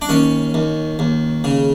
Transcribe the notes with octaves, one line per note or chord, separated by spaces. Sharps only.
D4
D#2 C#4
D#2
D#2
C#3